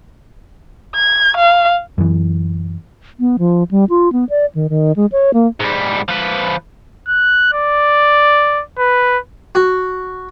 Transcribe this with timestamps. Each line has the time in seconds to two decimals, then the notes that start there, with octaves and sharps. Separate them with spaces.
0.95 G#6
1.37 F5
1.98 F#2 E3
3.20 B3
3.39 F3
3.71 G3
3.90 F4
4.12 B3
4.30 D5
4.55 D#3
4.69 D#3
4.96 G#3
5.12 C#5
5.34 A#3
5.60 G#2 G3
6.08 F3 B4
7.08 F#6
7.54 D5
8.79 B4
9.55 F#4